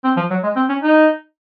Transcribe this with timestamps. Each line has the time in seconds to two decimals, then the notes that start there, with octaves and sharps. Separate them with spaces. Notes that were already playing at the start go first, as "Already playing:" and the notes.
0.04 C4
0.17 F3
0.31 F#3
0.43 G#3
0.56 C4
0.69 C#4
0.83 D#4